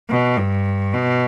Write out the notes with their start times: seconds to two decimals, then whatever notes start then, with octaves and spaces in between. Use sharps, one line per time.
0.10 B2
0.38 G2
0.93 B2